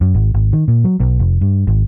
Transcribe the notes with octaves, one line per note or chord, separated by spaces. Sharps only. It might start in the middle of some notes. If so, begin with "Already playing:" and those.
F#2
G#1
G#1
D#3
A#2
F#3
B1
F1
G2
G#1